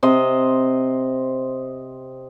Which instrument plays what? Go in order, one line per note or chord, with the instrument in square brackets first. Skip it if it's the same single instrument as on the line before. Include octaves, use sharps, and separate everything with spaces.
[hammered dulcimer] C3 C5 D#5